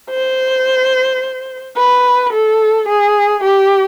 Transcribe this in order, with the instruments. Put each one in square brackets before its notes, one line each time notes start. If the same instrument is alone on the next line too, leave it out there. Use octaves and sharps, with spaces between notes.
[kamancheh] C5
B4
A4
G#4
G4